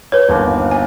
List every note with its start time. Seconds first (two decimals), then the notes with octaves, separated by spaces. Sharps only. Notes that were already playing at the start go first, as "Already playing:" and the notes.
0.12 B4 C#5
0.29 G1 D#2
0.71 G#5